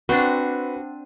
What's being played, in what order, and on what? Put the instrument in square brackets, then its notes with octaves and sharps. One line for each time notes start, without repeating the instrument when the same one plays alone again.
[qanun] C4 D4 [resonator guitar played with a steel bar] F#4 [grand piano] B4